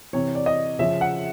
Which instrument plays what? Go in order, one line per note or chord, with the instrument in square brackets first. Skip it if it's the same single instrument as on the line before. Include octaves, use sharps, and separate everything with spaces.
[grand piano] C3 E3 C#5
D5
D#5
C#3 F3 E5
F#5